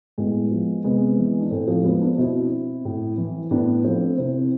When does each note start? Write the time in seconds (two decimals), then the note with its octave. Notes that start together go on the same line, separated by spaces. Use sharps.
0.18 A2 G#3 B3
0.51 F3
0.84 C3 G#3 B3
1.18 E3
1.40 D4
1.51 A2 A3 C4
1.68 F3 A3
1.85 F3 G#3 B3
2.01 B3 D4
2.18 B2 C4 E4
2.85 A2
3.18 E3
3.51 A2 B3 D4
3.84 F3 A3 C4
4.18 C3 C4 E4